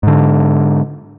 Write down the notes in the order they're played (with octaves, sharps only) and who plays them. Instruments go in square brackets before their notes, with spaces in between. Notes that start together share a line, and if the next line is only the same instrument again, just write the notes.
[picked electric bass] G#2 D3